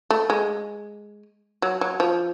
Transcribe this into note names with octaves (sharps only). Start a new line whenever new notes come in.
A3
G#3
F#3
F#3
F3